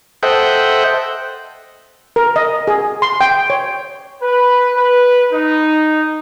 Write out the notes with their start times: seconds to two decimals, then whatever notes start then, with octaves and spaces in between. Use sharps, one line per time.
0.23 A4 C5 D#5 E5 F#5 G5
2.16 A#4
2.36 D#5
2.68 G#4
3.02 C6
3.21 G5
3.50 C#5
4.21 B4
4.76 B4
5.33 D#4